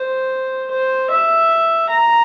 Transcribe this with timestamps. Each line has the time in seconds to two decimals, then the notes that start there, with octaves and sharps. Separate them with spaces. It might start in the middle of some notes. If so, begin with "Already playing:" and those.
Already playing: C5
0.71 C5
1.10 E5
1.89 A#5